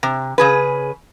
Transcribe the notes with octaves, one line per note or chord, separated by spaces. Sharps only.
C3
C#3 G#4 B4